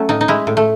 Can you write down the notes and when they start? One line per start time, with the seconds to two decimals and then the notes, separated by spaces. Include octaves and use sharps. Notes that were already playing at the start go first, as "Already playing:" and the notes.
Already playing: F#3 A3 C#4
0.09 A2 D#4
0.21 D#4
0.28 G#3 E4
0.47 A2
0.57 A3